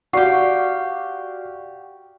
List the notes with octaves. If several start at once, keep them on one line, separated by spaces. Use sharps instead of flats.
F#4 G4 D5 F5 F#5 C#6 C7